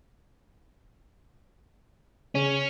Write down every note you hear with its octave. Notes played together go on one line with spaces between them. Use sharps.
C#3 C#4